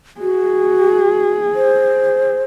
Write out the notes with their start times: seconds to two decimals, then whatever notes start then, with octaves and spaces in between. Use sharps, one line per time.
0.21 F#4 G#4
1.55 C5